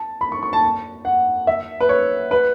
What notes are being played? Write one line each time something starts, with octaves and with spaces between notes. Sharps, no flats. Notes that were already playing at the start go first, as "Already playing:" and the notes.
Already playing: A5
B5
C#6
C#6
A5
F#5
E5
B4
C#5
B4